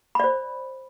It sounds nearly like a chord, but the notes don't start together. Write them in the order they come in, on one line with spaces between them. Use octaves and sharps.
B5 D5 C5